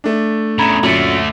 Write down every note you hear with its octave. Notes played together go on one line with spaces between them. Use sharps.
A3 D4
E2 C#3 A#5 B5 G#6
F#2 A#2 D3 A3 C#7 F#7